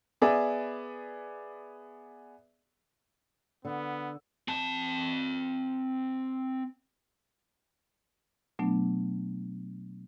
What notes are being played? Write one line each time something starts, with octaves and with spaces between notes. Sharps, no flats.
B3 G#4 D5 E5
D3 B3
C4 A5
B2 F#3 A3 B3 D4